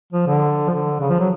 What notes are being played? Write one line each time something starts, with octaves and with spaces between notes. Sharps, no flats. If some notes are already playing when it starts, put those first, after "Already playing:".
F3
D3
F3
D3
C#3
F3
F#3